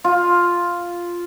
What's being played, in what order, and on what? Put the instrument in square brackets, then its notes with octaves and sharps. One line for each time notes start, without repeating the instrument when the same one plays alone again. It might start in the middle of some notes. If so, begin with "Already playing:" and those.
[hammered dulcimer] F4